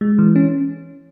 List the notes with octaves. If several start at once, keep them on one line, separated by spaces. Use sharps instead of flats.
G#3
E3
C#4